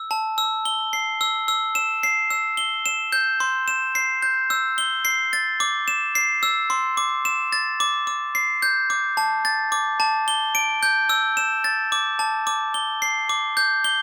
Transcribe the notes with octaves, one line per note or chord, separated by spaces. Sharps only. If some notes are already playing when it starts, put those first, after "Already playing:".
Already playing: E6
A5
E6
G7
C7
E6
E6
E7
C7
E6
G7
E7
G6
C6
E7
C7
G6
E6
G7
C7
A6
D6
E7
C7
E6
C6
D6
E7
A6
D6
D6
C7
G6
D6
A5
A6
D6
A5
G7
D7
G6
E6
E7
A6
D6
A5
D6
G7
C7
D6
G6
G7